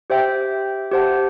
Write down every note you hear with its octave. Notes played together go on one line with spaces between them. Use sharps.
G4 C5 E5 G5
G4 C5 F#5 A5